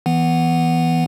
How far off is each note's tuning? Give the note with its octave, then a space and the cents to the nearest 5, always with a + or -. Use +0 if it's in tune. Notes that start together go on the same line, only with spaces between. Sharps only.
E3 -5 B3 +0 F#5 +0